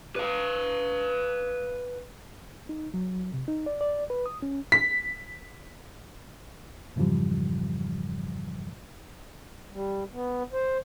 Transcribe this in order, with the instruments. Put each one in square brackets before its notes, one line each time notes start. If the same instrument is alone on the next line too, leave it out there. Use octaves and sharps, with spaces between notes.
[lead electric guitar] B4 F5
[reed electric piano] D#4
F#3
C3
D#4
D5
D5
B4
D#6
C#4
[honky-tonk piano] B6
[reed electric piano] F2 G#2 C#3 E3 F3 G3
[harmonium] G3
B3
C5